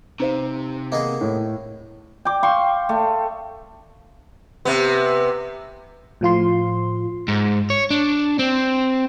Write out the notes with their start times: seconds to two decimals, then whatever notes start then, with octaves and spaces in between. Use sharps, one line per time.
0.20 C3 D#4 C5 F5
0.92 A#3 B3 G#4 D#5
1.21 A2
2.25 G5 D6
2.43 F5 G5 C6 C#6
2.89 A3
4.65 C3 B3
6.21 A2 F3 F4 C6
7.28 G#2
7.70 C#5
7.91 D4
8.39 C4